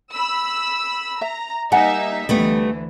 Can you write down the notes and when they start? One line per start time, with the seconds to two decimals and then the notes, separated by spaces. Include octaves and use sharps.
0.14 B5 E6
1.21 E5 A#5
1.72 G3 A#3 D#4 E5 F#5 G#5
2.29 D2 E3 G3 A3 B3